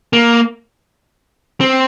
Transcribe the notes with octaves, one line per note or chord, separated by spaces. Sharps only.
A#3
C4